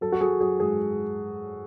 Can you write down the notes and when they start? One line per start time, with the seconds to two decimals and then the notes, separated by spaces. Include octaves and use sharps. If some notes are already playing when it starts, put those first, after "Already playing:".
0.01 F#3 A4
0.12 F#4
0.21 F#3 G#4
0.40 F#3 G#4
0.60 G#2 G#4